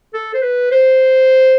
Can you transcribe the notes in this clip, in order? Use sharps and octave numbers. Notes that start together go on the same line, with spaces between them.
A4
C5
B4
C5